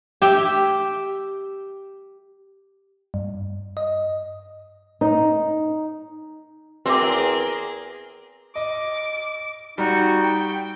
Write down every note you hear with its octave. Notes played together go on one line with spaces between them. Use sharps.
G4 E5 G5
G2
D#5
D#4
E2 C4 F#4 G#4 A#4 E5 D6
D#5 D6
G3 D#4 F#4
G5